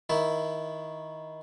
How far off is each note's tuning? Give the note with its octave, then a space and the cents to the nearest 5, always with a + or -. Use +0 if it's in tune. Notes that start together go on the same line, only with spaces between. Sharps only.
D#3 +15 E4 +5